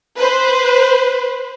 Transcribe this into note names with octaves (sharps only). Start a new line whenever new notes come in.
B4 C5